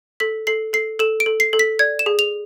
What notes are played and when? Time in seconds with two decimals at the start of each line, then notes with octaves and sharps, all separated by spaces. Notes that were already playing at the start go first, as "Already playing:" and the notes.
0.20 A4 B6
0.47 A4 C7
0.73 A4 C7
0.99 A4 E7
1.20 D7
1.26 A4
1.40 C7
1.53 A4
1.59 B6
1.79 D5 G#6
1.99 E7
2.06 G#4
2.19 F7